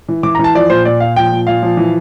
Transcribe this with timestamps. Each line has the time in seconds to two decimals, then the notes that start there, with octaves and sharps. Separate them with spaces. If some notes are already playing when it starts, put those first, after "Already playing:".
0.09 E3
0.23 E3 D6
0.35 A#5
0.39 E3
0.44 A5
0.54 F3 D5
0.70 A#2 C5
0.85 A#2 D5
1.00 A#2 F5
1.16 F3 G5
1.32 A#2
1.47 A#2 F5
1.63 F3
1.77 E3